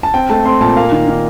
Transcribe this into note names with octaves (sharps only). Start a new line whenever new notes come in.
A5
C4 G5
A3 A5
C4 C6
A#2 A5
A#3 F5
D#3
D#3